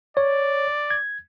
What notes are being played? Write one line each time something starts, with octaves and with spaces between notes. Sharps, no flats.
C#5 D5
G#6